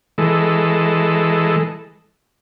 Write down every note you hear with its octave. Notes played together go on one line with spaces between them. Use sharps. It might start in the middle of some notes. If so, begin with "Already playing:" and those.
E3 G#3 A4